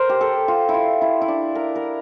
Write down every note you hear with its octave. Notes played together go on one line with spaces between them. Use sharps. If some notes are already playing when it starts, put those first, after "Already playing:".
Already playing: A#4 C5
G4
A4
F4
E4
F4
E4
E4
D4
A#4
A#4